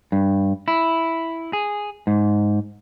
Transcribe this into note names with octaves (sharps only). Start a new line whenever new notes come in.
G2
E4
G#4
G#2